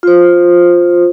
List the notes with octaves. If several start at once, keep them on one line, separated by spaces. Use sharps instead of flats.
F4 C5